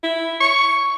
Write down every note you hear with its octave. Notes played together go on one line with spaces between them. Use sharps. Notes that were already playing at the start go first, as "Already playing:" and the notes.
E4
C#6